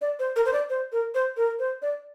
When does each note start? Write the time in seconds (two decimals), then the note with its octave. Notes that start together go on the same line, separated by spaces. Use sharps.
0.01 D5
0.19 C5
0.36 A#4
0.45 C5
0.53 D5
0.70 C5
0.92 A#4
1.15 C5
1.37 A#4
1.59 C5
1.82 D5